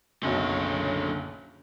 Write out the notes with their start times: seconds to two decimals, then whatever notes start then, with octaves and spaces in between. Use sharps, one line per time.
0.23 F#1 B1 D3 C#5